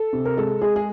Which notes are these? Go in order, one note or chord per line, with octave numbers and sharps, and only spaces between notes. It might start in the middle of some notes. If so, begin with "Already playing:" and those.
Already playing: A4
C3
A#4
G#3 A4
G#3 G#4
G#4